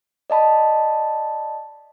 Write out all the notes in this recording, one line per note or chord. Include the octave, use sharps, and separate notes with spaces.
D5 D#5 A5 B5